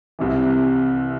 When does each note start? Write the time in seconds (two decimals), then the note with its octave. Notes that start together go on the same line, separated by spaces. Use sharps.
0.19 C2 C3 E3